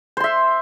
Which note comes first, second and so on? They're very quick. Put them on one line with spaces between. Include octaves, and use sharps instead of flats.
C5 C6 E5